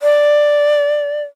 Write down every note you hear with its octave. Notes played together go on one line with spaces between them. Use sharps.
D5